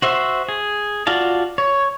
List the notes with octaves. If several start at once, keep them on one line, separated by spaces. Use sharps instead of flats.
F#4 C5 E5
G#4
F4 F#4 D5 F5 A5
C#5